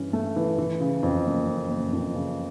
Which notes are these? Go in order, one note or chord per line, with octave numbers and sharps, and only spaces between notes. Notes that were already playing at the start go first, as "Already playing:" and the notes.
Already playing: G2 E3 C#4
A3
E3
E3
C#3
F2
F#1
C#3
F#1
F2
C#3